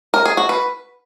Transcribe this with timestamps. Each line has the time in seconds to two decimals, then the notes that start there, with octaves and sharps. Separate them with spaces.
0.14 A#4
0.26 G#4
0.37 F#4
0.49 B4